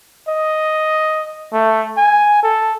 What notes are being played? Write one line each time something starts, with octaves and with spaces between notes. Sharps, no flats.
D#5
A3
G#5
A4